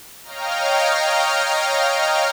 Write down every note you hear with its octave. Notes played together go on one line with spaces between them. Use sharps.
C#5 D#5 F5 G5 A#5 F6